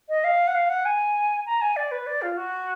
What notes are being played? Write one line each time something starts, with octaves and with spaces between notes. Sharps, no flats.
D#5
F5
F#5
F5
F#5
G#5
A#5
G#5
D5
B4
D5
F4
F#4